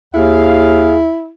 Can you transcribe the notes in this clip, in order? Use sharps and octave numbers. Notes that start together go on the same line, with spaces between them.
D#2 E4 G#4 F5